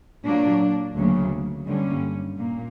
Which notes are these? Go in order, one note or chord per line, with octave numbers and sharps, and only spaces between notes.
A#2 F#3 A#3 D4
D2 C#3 F#3 A#3
G2 D3 G3 A#3 C#4
A#2 A#3